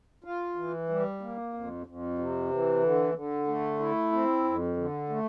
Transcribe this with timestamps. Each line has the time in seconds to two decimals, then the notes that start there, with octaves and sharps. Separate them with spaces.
0.24 F4
0.56 E3
0.89 G3
1.21 A#3
1.54 F2
1.86 F2
2.19 C3
2.50 E3
2.83 D3
3.15 D3
3.47 A3
3.79 E4
4.12 C4
4.44 F2
4.77 D3
5.09 A3